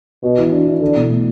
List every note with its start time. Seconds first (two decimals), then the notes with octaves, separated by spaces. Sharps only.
0.23 B2 F#4
0.38 E3
0.52 D4
0.67 E3
0.81 D3 E4
0.96 B2
1.10 A3